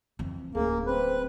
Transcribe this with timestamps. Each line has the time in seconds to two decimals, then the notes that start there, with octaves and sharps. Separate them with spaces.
0.19 F2 E3
0.55 D1 A#3 C#4 G#4
0.87 C4 B4